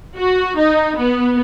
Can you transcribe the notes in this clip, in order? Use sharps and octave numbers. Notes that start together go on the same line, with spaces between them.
F#4
D#4
B3